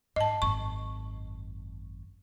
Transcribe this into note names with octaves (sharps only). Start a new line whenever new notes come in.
G#2 D#5 A5
G#1 F#2 C#6